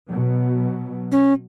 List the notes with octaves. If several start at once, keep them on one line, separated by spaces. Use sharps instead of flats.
B2 F#3
C#4